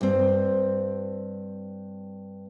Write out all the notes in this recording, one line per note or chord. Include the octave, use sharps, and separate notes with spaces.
G2 C4